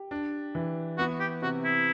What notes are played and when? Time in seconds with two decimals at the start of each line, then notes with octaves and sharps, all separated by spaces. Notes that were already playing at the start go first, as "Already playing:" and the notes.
Already playing: G4
0.11 D4
0.55 E3
0.98 B3 F#4
1.20 G4
1.42 C3 F#4
1.64 E4